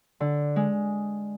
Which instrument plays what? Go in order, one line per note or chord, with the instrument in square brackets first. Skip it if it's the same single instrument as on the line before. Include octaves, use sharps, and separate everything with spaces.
[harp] D3
G#3